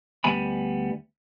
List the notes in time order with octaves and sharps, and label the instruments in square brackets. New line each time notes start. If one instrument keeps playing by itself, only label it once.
[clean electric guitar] D2 G3 B3 G#5 B5